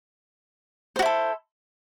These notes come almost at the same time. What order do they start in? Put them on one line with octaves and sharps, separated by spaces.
C5 F#4 E4 A4